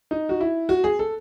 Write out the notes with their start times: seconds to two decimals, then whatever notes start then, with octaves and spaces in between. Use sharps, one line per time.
0.11 D#4
0.29 F#4
0.41 E4
0.69 F#4
0.84 G#4
0.99 A4